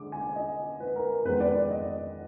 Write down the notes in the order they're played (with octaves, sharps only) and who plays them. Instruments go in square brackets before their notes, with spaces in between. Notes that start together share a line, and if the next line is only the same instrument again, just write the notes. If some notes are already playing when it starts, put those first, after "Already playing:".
Already playing: [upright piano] D3 G#3 D6
G#5
D#5
B4
A#4
A#4
F2 D#3 G#3 B3 B4
D5
D5
D#5